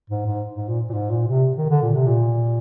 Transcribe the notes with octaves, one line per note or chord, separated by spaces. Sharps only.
G#2
G#2
G#2
A#2
A#2
G#2
A#2
C3
D#3
D3
A#2
C3
A#2